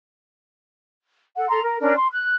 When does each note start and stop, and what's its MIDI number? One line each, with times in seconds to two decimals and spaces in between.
1.36 1.48 69
1.36 1.48 78
1.49 1.61 69
1.49 1.61 82
1.49 1.61 84
1.62 1.78 70
1.80 1.94 61
1.80 1.94 62
1.80 1.94 70
1.95 2.07 84
2.12 2.35 90